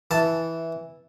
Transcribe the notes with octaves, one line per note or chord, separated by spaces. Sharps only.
E3 A5